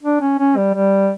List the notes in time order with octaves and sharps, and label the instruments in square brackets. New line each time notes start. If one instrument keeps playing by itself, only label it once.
[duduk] D4
C#4
C#4
G3
G3